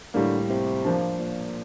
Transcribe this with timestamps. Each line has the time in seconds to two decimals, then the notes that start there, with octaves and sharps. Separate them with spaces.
0.14 A2 D3 G3 A#3
0.50 C3
0.84 F3 A#3 D4
1.19 A#2